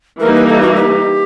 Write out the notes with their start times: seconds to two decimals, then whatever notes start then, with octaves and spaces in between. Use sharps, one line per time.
0.20 E3 G3 A#3 D#4 A#4
0.35 B4
0.48 A4
0.62 F#4
0.75 G4